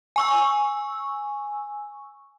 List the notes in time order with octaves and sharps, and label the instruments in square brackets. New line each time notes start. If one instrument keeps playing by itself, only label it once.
[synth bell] G#5 C#6 E6